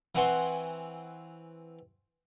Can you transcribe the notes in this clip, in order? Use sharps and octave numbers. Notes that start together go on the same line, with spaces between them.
E3 C4 F#5 G#5 C6 C#6